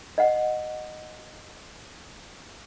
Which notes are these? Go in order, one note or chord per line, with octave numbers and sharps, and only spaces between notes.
D#5 F#5